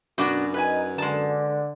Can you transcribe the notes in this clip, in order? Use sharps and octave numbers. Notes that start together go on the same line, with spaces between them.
F#2 B2 D4 F#4
D#4 B4 G#5
D3 G#3 A5